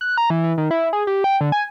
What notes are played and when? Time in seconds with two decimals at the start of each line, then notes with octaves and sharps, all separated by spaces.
0.01 F#6
0.18 A#5
0.30 E3
0.44 E3
0.58 D#3
0.71 E4
0.93 G#4
1.07 G4
1.24 G5
1.41 D3
1.52 G#5